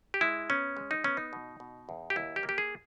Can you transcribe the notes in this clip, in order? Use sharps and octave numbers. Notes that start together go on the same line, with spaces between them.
G4
G#3 E4
B3 C#4
G#3
D#4
B3 C#4
D#4
B2
B2
E2
G4
D#2 E4
G4
A#3
G4
G#4